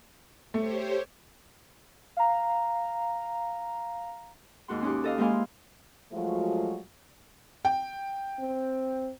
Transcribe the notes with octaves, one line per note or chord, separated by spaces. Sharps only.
A3 G4 C5 C#5
F5 A#5
D#2 G#2 F#4 C6
C#4 D#4 F#4 G4
A4 D#5 F5
G#3 A#3 E4 C5 F5 G#5
F3 F#3 G#3 A3 F4 F#4
G5
C4